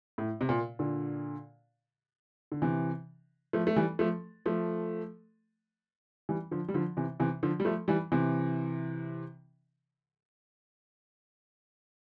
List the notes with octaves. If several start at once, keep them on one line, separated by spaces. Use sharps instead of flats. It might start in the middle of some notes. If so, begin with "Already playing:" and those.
A2
C3
A#2
A#2 D3
D3
C3 E3
F3 A3
A3
E3 G3
F3 A3
F3 A3
E3 G3
D3 F3
G3
D3 F3
C3 E3
C3 E3
D3 F3
G3
F3 A3
E3 G3
C3 E3